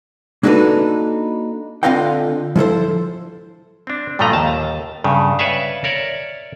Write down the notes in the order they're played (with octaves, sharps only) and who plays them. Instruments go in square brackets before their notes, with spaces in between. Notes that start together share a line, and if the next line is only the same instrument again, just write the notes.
[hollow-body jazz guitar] A#3 D4 D#4 F#4 A4 B4
D3 C4 F4 D#5 F5 G5
F3 E4 A4 C5
[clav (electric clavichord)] C4 D4
G2 A#2 F3 A3 D#5 A#5
D#2 A5
G2 C#3
B4 C#5 D5 E5 F5
A#4 C#5 D5 E5